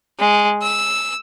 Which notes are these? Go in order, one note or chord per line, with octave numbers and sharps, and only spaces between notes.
G#3
E6